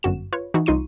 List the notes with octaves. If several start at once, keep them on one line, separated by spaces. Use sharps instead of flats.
G1 F#2 F#4 E7
F4 B4 C#5
E3 D#4 F#4
C2 D#4 F4 C6 C#6 D#7